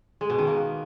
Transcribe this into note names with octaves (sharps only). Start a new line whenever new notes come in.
G#3
B2
D#3
A#3